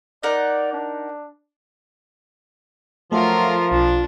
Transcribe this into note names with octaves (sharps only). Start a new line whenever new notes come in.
D#4 A#4 D5 F#5
D4
F3 F#3 A3 F4 A4 A#4 E5
B1 D4 F4